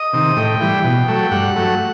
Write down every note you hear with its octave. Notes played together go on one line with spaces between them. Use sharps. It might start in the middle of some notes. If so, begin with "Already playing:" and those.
Already playing: D#5
C3 D#3
A2 G5
E3 G3
B2
F#3 A3
G2 F#5
F#3 A3